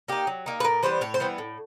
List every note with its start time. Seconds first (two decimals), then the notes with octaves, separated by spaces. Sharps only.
0.08 A#3 D#4 G4
0.27 F#3
0.46 A#3 D#4
0.60 B4
0.64 A2 A#4
0.83 E3 G3 B3 C5
1.01 A2 C#5
1.14 C5
1.20 E3 G3 B3
1.38 A2